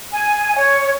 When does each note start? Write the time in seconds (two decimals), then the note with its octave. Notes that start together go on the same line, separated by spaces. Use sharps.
0.12 G#5
0.56 C#5